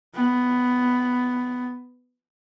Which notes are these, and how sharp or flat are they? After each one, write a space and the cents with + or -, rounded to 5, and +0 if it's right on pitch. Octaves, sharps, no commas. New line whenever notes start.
B3 +10